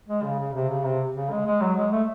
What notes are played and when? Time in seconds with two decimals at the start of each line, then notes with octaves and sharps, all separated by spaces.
0.08 G#3
0.23 C#3
0.39 C#3
0.54 C3
0.69 C#3
0.84 C3
1.15 C#3
1.31 G#3
1.47 G#3
1.61 F#3
1.77 G#3
1.92 A3